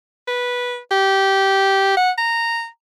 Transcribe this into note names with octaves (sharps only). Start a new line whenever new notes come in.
B4
G4
F#5
A#5